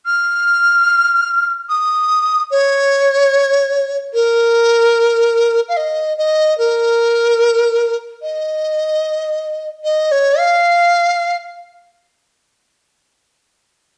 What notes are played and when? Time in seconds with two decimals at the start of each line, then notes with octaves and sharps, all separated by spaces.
0.06 F6
1.69 D#6
2.51 C#5
4.13 A#4
5.68 F5
5.76 D#5
6.17 D#5
6.58 A#4
8.22 D#5
9.84 D#5
10.11 C#5
10.38 F5